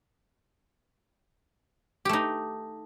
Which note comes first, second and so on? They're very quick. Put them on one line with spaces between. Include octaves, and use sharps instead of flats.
G4 A3 D#4